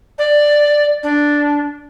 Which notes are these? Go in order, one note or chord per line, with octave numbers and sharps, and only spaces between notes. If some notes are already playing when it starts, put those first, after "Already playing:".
D5
D4